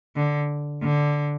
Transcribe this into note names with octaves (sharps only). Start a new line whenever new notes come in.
D3
D3